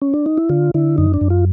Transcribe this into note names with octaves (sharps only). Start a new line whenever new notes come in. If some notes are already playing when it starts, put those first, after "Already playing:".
C#4
D4
D#4
E4
D3 F4
D3 E4
F#2 D#4
D4
F#2
F4